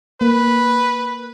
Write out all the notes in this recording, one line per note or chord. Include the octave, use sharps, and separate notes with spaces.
A#3 B4